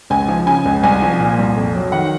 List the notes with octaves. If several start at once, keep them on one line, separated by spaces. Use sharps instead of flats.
C#2 G#5
F3
C#3 G#5
C#2
C2 G#5
F3
A#2
C2
F2
F#3
D#3 F#5